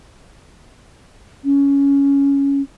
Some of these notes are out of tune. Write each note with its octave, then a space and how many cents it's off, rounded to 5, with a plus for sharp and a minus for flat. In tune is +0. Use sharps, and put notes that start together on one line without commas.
C#4 +10